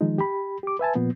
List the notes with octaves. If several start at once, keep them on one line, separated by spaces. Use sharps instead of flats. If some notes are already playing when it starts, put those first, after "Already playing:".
D#3 F3 G#3 D#4
G4 B5
G4 D6
B4 E5 G#5 A5
A#2 F3 B3